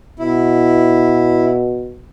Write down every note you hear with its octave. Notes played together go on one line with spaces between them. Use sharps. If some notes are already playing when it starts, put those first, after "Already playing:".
B2 E4